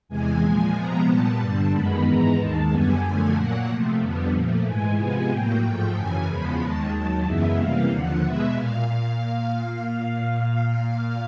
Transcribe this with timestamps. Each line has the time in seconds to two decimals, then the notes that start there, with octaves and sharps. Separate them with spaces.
0.08 E2 C3 E3 G#3 G#5
0.41 A#2 F3 G#3 G#5
0.74 C3 F3 G#3 B3 A#5
1.06 A#2 G3 B3 A5
1.39 G2 D3 G3 A5
1.72 F#2 D#3 G#3 B3 B5
2.04 G#2 E3 G#3 B3 A#5
2.36 D#2 D#3 G#3 A5
2.69 F#2 D3 G3 B3 G#5
3.02 F#2 D3 F3 A3
3.34 A#2 F#3 A#3 F#5
3.67 C3 F3 A3
3.99 F2 D3 G3 B3
4.32 A#2 F3 A3
4.64 G#2 E3 G#3 G#5
4.96 C3 F3 G#3 B3
5.30 A2 F#3 A#3 G5
5.62 G#2 F3 A3
5.95 F#2 C#3 E3 G#5
6.27 E2 C#3 F3 G#3 B3 B5
6.60 D#2 D#3 G#3 A5
6.92 D#2 D#3 F#3
7.24 F#2 C#3 E3 G#3 B3 E5
7.57 C3 E3 G3 A#3 F5
7.90 D#2 D3 F3 F#5
8.22 B2 G#3 B3 E5
8.55 A#2 F5